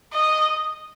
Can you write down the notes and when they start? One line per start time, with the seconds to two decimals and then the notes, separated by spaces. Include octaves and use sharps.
0.13 D#5